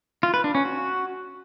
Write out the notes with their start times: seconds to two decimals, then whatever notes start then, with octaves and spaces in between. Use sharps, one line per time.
0.23 F4
0.34 B4
0.44 D4
0.55 C#4
0.65 F#4